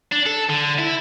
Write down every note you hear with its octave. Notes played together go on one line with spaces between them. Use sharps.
D4
A4
D3
E4